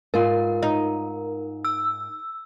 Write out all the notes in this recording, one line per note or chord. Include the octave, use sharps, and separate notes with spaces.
G#2 F4 A#4 B4
D#4
E6